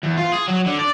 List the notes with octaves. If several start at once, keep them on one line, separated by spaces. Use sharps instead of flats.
E2
F4
G#4
F#3
D3
D5